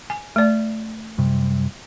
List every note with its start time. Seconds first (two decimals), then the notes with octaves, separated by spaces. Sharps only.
0.10 G#5
0.36 A3 D5
1.18 F#2 C3 G3